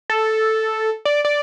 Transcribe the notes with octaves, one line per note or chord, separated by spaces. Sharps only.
A4
D5
D5